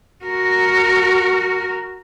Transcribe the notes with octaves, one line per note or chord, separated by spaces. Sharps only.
F#4 A#4